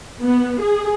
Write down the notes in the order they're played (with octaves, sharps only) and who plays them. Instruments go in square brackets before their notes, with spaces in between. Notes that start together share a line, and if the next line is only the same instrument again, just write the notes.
[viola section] B3
G#4